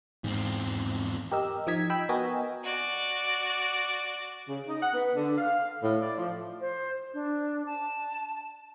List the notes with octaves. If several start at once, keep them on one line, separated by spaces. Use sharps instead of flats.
E2 G#2 C4
G4 A#4 D#5 E6
F3 D#4 D#5 G#6 B6
G5 B5 E6
B3 F#4 A#4 D#5 G5 G#5
F#4 D5
C#3
D#4
F#5
B3
D3
F5
A2
D5
F3
C5
D4
A5